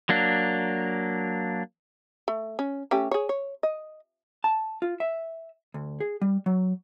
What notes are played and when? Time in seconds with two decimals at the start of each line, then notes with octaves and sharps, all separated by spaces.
0.09 F#3 A#3 D4
2.28 A3
2.59 C#4
2.91 A3 C#4 G4
3.11 G#4 C#5
3.29 C#5
3.63 D#5
4.44 A5
4.82 F4
5.00 E5
5.74 D2
6.00 G#4
6.22 G3
6.46 F#3